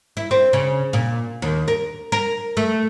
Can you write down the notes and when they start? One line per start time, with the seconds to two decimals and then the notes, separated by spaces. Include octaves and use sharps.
0.17 E4
0.31 C4
0.53 C#3
0.93 A#2
1.42 D#2
1.68 A#4
2.12 A#4
2.57 A3